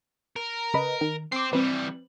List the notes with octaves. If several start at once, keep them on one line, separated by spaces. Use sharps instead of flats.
A#4
C#3 B4 D#5
D#3
C4 D6 C7
E3 G3 C4 B4